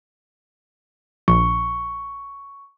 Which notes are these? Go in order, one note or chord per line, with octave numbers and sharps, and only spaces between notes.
A#1 C#6